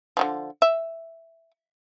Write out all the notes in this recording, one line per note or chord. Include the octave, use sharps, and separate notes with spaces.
D3 D#3 F3
E5